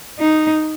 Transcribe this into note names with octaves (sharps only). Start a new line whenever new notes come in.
D#4